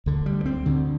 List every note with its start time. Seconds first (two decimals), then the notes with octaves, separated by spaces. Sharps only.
0.06 D2 D3
0.26 G3
0.46 C4
0.66 D2 D3